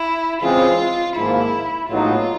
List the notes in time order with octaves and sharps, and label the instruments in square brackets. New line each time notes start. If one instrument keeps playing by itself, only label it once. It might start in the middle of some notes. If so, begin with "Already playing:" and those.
Already playing: [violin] E4
[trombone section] C#3 E3 G#3 C4 [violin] F4
[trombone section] G#1 G#2 F3 A#3 [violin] E4
[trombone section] A#1 A2 F#3 B3 D#4 [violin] F4